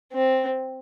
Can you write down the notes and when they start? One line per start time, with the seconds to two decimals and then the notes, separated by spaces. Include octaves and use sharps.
0.13 C4